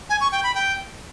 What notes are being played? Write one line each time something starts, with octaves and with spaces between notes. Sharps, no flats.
G#5
C#6
G5
B5
G5